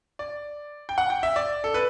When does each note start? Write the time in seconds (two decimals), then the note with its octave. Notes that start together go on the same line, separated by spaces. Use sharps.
0.19 D5
0.89 G5
0.98 F#5
1.10 G5
1.23 E5
1.36 D5
1.64 A4
1.74 B4